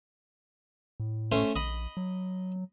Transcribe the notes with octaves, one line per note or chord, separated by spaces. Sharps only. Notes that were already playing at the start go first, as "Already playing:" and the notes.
A2
A3 C#4 C5
A#1 D#5 B5
F#3